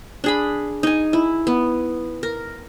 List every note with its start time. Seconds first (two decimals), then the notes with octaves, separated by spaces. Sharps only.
0.24 D4 G#4 B5
0.83 D#4 G#5
1.13 E4
1.47 B3
2.23 A#4